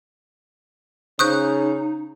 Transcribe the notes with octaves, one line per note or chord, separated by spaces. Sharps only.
C#3 D#4 C5 C#6 D#6 F#6 G6